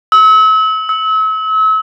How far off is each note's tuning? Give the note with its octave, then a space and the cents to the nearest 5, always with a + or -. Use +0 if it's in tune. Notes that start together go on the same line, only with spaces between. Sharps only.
E6 -40
E6 -35